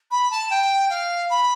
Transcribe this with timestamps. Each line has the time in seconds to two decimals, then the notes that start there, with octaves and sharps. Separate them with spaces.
0.11 B5
0.31 A5
0.50 G5
0.90 F5
1.30 B5